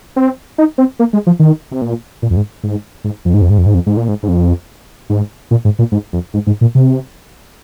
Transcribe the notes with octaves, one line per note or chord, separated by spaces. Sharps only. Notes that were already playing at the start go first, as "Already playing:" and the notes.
C4
D#4
C4
A#3
G#3
F3
D#3
C3
A#2
A#2
F2
G#2
G#2
G#2
F2
G#2
F2
G#2
F2
G#2
F2
G#2
A#2
G#2
G#2
F2
G#2
A#2
G#2
A#2
G#2
F2
G#2
G#2
A#2
C3